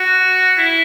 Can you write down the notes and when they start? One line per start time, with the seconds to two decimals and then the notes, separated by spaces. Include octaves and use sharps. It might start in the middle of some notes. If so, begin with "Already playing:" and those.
Already playing: F#4
0.58 E4